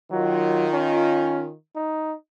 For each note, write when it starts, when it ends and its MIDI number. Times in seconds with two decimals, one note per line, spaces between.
0.12 1.52 51
0.12 0.67 54
0.12 1.52 65
0.73 1.44 61
1.75 2.13 63